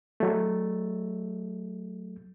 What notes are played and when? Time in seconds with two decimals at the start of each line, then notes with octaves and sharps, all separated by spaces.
0.20 F#3 A3